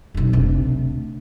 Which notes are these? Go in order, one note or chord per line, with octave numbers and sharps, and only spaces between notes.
F1 B1
D2 C3